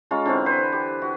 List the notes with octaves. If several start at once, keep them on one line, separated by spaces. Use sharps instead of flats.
G#3 C#4 F4 A#5
D3 E3 C4 F#4
B4 C5
G4
F#4